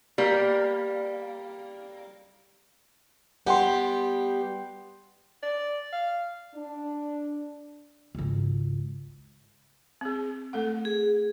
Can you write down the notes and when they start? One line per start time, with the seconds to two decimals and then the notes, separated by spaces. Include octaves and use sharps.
0.18 G3 A#3
3.46 G3 B3 G4 F#5 G5 C6
5.43 D5
5.93 F5
6.55 D4
8.15 G#1 C#2
10.01 C4 G#4
10.53 A3 A4 F#5
10.85 G#4